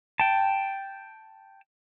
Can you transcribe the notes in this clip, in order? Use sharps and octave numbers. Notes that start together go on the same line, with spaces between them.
G5 A5